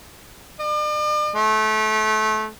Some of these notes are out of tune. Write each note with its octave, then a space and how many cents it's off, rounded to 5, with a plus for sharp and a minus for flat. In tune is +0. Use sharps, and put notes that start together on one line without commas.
D5 +45
A3 -25